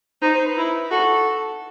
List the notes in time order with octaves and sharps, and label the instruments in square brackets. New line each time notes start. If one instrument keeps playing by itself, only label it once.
[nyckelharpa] D#4 [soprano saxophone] C5
[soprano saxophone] C5
B4
[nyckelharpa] E4
[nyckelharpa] F#4 [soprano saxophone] A4